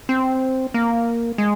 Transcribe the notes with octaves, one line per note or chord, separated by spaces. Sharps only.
C4
A#3
G#3